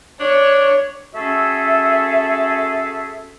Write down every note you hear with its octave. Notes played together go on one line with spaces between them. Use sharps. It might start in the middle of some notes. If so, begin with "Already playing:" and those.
D4 C#5
A3 C#4 F#4 G#4 A4 E5